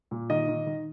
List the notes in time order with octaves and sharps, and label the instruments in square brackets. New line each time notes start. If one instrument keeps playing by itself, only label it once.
[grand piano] A#2
D#3 D#5
D#3
D#3